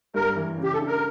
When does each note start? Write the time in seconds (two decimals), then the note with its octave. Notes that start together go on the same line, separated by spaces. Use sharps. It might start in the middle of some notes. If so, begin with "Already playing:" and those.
0.14 G2 A#4
0.36 E3
0.58 C#3
0.63 G4
0.73 A4
0.79 D4
0.87 A#4